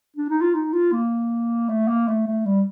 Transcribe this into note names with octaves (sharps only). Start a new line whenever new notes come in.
D4
D#4
F4
D#4
F4
A#3
A3
A#3
A3
A3
G3